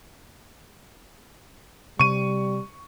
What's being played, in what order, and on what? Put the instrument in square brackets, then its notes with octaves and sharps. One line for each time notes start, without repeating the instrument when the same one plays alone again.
[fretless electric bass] C3 C4 [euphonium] G3 [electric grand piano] C#6 D#7